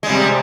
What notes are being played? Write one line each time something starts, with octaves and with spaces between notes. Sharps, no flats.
C3 G3 G#3